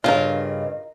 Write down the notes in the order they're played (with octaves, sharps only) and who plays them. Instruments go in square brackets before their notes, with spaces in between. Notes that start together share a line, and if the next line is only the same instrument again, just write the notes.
[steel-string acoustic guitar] G2 C#3 [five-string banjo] F4 A#4 [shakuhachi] D#5